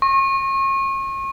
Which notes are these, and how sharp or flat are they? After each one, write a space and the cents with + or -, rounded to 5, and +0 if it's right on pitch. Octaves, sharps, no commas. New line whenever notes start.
C#6 -35